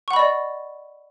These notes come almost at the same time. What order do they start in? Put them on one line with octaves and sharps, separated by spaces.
C#6 F#5 B5 D#5 D5